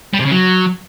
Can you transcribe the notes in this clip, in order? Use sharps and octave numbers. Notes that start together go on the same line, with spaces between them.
G3
C3
C#3
F#3